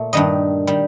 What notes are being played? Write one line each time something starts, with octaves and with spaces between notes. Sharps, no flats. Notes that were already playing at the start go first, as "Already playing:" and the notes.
Already playing: A#2 A3
G2 D#3 G3 D#5
D#3 G3